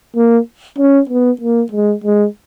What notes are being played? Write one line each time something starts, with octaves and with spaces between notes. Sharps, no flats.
A#3
C#4
B3
A#3
G#3
G#3